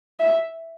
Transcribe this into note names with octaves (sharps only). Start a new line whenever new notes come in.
E5